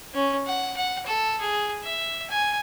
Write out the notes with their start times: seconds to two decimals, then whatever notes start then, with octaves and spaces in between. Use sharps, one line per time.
0.14 C#4
0.46 F#5
0.76 F#5
1.06 A4
1.40 G#4
1.83 E5
2.30 G#5